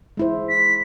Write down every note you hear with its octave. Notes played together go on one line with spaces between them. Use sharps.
G#3 E4 C5
B6